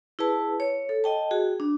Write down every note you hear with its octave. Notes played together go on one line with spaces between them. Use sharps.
E4 G#4 B4 A5
C#5
A4
D#5 G5 A5
F#4 G#4
D4